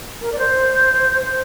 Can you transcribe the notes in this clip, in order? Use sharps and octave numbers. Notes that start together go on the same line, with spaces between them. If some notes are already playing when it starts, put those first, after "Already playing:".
A#4
D5
C5
C5